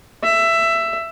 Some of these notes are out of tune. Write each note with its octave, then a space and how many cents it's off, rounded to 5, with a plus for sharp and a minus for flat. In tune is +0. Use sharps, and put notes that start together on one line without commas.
E5 +15